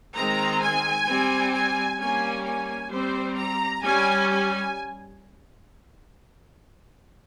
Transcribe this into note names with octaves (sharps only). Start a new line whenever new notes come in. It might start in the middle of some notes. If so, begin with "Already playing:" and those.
D#3 G#3 C4 A#5
G#5
G3 C4
G#5
G3 A#3 C#4 G#5
G#5
G3 C4 C5
A#5
G3 C#4 G#5
G#5